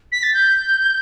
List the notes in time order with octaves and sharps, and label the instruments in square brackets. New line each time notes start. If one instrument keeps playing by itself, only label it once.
[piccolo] B6
A6
G6